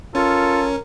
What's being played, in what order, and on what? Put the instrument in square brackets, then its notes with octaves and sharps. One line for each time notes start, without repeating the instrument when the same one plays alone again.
[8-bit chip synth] C#4 [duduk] F4 [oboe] A4 [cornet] A#4